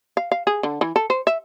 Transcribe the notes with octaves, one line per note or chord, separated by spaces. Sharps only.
F5
F5
G#4
D3
E3
A4
C5
E5